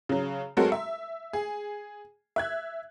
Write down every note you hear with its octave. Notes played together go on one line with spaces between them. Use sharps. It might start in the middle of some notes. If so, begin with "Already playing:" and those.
C#3 F#3
F#3 G#3 C4 F#4 A4 A#4
E5
G#4
E5 F#6 G#6